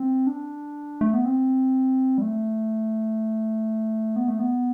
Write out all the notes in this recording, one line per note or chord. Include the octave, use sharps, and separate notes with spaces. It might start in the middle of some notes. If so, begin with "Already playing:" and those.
Already playing: C4
D4
A3
B3
C4
G3
A3
B3
A3
B3